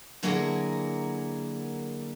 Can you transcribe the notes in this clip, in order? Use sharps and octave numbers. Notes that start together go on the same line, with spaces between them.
D3 F#3 A#3 E4 G#4 A#4